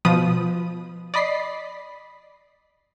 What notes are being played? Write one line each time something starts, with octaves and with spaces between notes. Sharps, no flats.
B2 F3 B4 D#6 D#7
D5 D#5 B5 B6 C7